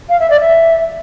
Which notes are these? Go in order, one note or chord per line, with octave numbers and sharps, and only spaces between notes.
F5
E5
D5
E5